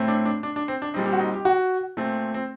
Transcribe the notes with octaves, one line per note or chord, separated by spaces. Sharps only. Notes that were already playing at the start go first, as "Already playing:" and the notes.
Already playing: A2 A3 C4
D4
D4
D4
D4
C4
D4
A#2 G3 C4 D#4
G4
F#4
D#4
G4
F#4
A#2 A3 C4
C4